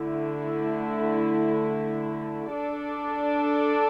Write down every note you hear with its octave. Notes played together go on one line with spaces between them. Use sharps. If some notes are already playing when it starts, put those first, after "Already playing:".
Already playing: D3 A3 E4
D4 A4 D5